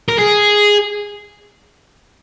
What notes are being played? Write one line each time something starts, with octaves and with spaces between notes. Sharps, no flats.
A#4
G#4